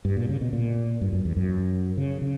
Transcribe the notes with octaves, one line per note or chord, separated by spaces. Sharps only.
G2
A#2
C#3
B2
A#2
G2
F#2
E2
F#2
C#3
C#3